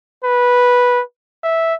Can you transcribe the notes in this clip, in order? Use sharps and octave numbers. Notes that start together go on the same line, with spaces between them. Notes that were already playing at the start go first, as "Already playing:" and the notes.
B4
E5